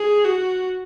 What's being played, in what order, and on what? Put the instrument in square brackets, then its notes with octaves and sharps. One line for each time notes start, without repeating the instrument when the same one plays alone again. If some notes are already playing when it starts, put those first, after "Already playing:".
Already playing: [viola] G#4
F#4